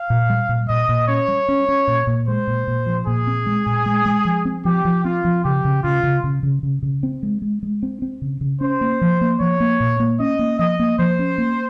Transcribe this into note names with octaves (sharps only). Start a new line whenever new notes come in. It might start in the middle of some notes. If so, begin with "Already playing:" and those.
Already playing: F5
A#2
G3
A#2
A#2 D#5
A#2
C#4 C#5
G3
C#4
C#4
A#2
A#2
G#3 C5
A#2
A#2
F3
A#2 G#4
C4
G#3
A#2
G#3
G#3
F3
C4
F3 G4
F3
C4 F4
F3
C#3 G4
C#3
C#3 F4
C#3
C#3
C#3
C#3
C#3
C4
G#3
G#3
G#3
C4
C4
C#3
C#3
C#4 C5
A#3
F3
A#3
F3 C#5
A#3
A#2
A#3
C#4 D#5
A#3
F3 D#5
A#3
F3 C5
C#4
A#3